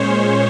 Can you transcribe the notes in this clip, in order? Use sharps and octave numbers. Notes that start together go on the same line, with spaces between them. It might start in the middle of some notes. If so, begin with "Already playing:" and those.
Already playing: A#2 G#3 C#4 C5 C#5